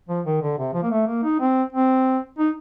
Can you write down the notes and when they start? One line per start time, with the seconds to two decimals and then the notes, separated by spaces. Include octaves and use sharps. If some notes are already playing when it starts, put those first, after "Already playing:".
0.09 F3
0.26 D#3
0.42 D3
0.58 C3
0.74 F3
0.82 A#3
0.91 A3
1.07 A#3
1.23 D#4
1.40 C4
1.72 C4
2.38 D#4